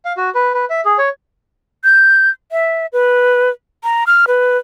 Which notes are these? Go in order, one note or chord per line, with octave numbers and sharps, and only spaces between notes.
F5
F#4
B4
B4
E5
G#4
C#5
G6
E5
B4
A#5
F6
B4